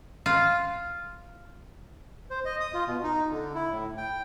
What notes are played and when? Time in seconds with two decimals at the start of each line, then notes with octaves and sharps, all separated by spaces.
0.26 F4
2.30 C5
2.45 D#5
2.60 D#6
2.74 F4
2.87 B2
3.04 D#4
3.31 D3
3.54 E4
3.70 A2
3.97 G5